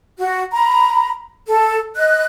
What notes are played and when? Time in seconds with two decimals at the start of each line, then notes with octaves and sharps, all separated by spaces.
0.19 F#4
0.52 A#5 B5
1.48 A4
1.95 D#5 F#6